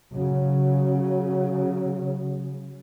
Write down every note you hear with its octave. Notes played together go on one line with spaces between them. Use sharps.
C#3 F#3